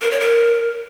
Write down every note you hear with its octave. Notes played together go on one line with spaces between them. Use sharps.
A#4
C#5
A#4